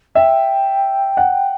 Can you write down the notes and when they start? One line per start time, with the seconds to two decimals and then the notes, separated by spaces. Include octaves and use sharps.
0.15 E5 G5
1.17 F#5